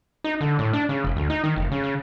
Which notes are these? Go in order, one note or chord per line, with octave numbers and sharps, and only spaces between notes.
D#4
D3
A2
D4
C#3
F1
D2
D#4
D#3
F1
C#3
C#3